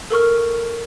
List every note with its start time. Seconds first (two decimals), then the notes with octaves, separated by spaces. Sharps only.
0.10 A4 A#4 C#6 F6